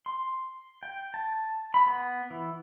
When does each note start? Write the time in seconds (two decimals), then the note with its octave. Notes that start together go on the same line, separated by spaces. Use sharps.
0.06 C6
0.83 G5
1.14 A5
1.74 B5
1.86 B3
2.30 E3